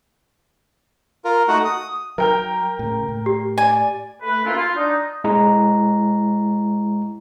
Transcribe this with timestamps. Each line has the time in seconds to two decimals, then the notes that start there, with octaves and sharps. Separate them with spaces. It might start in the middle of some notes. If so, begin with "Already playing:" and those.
1.25 F4 A#4
1.48 A3 D#4 F#4 F#5
1.65 D#6
2.18 F#3 A#4 G5 F6
2.79 A2 C#3
3.09 A2
3.26 G4
3.58 D5 G#5
4.22 A3 B4
4.45 A#3 C#4 E4 F4
4.56 F4
4.75 D4 D#4
5.24 G#3 E4 A#5